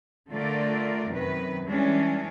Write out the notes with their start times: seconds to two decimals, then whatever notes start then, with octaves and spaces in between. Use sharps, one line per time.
0.31 D3 A3 F4 A#4 D5
1.12 F#2 C3 D#3 F#3 B4
1.67 E3 G3 G#3 C#4 D4